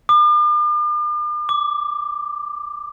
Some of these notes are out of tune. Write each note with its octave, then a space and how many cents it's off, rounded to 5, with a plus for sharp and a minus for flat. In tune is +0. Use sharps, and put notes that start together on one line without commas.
D6 +45
D6 +0